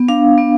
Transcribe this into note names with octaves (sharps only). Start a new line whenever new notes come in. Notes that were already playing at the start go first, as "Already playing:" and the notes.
Already playing: B3
D4 F5
B3